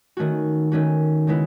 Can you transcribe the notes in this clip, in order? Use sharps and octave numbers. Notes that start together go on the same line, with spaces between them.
D#3 A3 C#4 F#4
D#3 A3 C#4 F#4
C#3 G#3 B3 E4